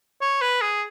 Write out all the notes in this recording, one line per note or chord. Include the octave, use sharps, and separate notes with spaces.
C#5
B4
G#4